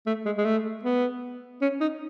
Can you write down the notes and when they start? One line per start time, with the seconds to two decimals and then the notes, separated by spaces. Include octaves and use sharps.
0.06 A3
0.25 G#3
0.37 G#3
0.45 A3
0.83 B3
1.62 C#4
1.80 D#4